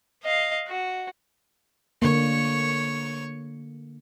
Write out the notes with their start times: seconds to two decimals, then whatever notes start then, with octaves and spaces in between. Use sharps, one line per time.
0.23 D#5 F5
0.68 F#4
2.02 D3 A#3 C#5 C#6